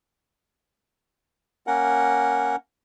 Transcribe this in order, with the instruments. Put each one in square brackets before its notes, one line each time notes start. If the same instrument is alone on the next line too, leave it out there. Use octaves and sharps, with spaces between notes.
[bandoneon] A#3 C#4 A#4 F#5